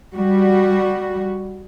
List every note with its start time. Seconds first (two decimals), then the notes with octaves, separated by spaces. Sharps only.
0.14 G3 F#4